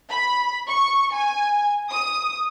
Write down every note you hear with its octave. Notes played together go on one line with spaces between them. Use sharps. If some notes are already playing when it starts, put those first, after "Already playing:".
B5
C#6
G#5
D#6